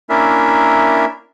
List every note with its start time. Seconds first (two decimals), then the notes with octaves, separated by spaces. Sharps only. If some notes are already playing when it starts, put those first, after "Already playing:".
0.10 A#3 C#4 D4 E4 A#4 E5